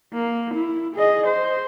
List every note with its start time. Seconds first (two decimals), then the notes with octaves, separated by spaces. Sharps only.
0.14 A#3
0.54 E4
0.96 G#4 D#5
1.27 C5